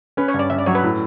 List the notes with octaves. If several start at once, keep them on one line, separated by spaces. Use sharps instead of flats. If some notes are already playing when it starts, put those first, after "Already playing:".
C#4 B4
C#5
G2
D5
G2 E5
D5
F#3 C#5
B4
A2